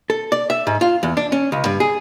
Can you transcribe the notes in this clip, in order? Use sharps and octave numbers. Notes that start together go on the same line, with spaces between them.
A4
D5
E5
G#2
F4
E2
D4
C#4
C#2
G2
G#4